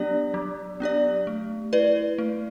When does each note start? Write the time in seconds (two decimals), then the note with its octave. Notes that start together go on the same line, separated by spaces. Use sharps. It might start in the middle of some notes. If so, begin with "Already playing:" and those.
Already playing: F#3 B3 D4 G4 D5
0.34 F#3
0.80 B3 D4 G4 D5
1.27 A3
1.73 E4 B4 D5
2.18 A3